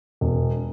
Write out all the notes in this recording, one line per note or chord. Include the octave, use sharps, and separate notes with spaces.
E1